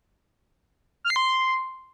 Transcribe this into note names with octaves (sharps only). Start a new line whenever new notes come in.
F6
C7
C6